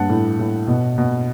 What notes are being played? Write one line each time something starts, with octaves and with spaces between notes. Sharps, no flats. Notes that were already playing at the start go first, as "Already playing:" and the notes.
Already playing: G2 F#5 A5
A2
A2
B2
B2